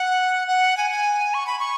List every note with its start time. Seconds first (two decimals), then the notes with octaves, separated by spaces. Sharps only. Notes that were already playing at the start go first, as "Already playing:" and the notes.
Already playing: F#5
0.48 F#5
0.77 G#5
0.91 G#5
1.34 C#6
1.47 B5
1.59 C#6